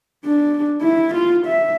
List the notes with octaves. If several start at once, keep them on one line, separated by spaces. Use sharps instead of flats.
D4
E4
F4
E5